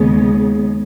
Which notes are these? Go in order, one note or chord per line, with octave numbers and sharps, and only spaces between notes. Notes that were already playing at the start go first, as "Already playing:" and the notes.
Already playing: D#2 C#3 G#3 B3